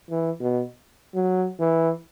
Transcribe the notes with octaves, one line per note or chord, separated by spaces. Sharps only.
E3
B2
F#3
E3